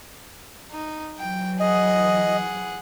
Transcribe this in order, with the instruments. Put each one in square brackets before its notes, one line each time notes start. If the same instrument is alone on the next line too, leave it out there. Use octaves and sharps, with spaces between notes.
[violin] D#4
[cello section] E3 F#3 [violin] G5
[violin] G#4 F#5 [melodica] D#5